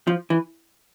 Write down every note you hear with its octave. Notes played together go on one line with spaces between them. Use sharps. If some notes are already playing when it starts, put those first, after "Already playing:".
F3
E3